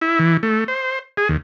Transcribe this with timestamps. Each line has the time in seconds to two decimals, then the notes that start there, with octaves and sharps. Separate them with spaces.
0.02 E4
0.19 E3
0.43 A3
0.68 C5
1.17 G#4
1.29 D#2